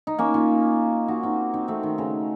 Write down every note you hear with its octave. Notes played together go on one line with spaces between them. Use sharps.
D#4
A#3 C#4
C#4 F4
D#4 F#4
C4 D#4
C4 D#4
A3 C4
D#3
C#3